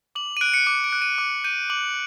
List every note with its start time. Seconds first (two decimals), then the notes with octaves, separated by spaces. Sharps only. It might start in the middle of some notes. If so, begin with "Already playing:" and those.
0.15 D6 F#7
0.37 D#7
0.41 F#6 D7
0.54 C#7
0.66 D6 C#7
0.84 D7
0.93 F#6
1.02 D#7
1.18 D6
1.44 G6 D#7
1.70 D6 F#7